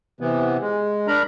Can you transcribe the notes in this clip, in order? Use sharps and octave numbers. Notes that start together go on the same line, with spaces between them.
C3 E3 B3
G#3
D4 A#4 A#5 B5